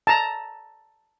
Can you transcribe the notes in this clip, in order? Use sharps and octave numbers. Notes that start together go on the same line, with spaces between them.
A5 A#5